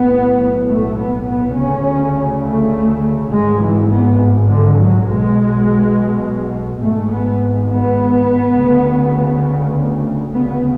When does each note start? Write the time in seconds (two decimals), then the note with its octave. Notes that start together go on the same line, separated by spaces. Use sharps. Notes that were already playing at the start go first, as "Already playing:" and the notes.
Already playing: B1 A2 B3
0.68 A3
0.97 B3
1.27 B3
1.56 D2 C#3 C#4
2.44 A3
3.31 G#1 G#2 G#3
3.61 E3
3.90 B3
4.48 D3
4.77 F#3
5.07 B1 B2 G#3
6.82 G#1 G#2 A3
7.11 B3
7.70 B3
8.57 D2 C#3
10.33 D2 C#3 B3